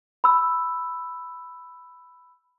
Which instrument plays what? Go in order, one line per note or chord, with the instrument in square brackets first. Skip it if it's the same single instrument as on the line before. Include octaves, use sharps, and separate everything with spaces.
[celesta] B5 E6